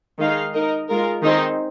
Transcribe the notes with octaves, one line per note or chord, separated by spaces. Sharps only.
D#3 G#3 D#4 G#4 F5
D#4 A#4 D#5
G#3 F4 A#4
D#3 C4 D#4 G#4 C5